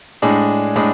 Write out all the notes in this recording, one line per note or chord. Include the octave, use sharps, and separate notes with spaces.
A2 G#3 D4 G#4
A2 G#3 D4 G#4